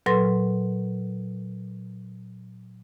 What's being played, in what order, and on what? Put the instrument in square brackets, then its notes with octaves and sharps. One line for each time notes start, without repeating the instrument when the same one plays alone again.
[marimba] A#2 F#3 A4 B4 C6 A#6